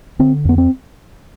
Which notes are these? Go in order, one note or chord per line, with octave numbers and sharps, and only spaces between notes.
D3 C4
F2 B3
C4